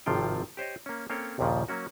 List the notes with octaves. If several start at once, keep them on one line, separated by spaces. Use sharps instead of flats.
G#1 A2 C3 F3 F4 G5
G4 C5 C#5 D#5
A#3 C#4
A#3 C4 C#4 A4 C#5 G5
A#1 D#2 A#2 C#3 F3
F#3 A#3 C#4 F#4